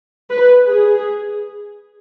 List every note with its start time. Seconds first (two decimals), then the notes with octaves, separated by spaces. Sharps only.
0.30 B4
0.68 G#4